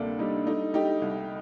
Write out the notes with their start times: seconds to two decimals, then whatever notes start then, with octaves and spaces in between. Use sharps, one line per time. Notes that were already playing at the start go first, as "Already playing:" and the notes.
Already playing: D2 C3 G3 A#3 D4 A4
0.19 G3 D#4
0.46 A3 D#4
0.74 A3 D#4 G4
1.02 C2